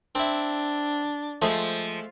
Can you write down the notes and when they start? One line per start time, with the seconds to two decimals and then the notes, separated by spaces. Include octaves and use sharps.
0.15 C4 D4 E4
1.42 F3 G#3 A3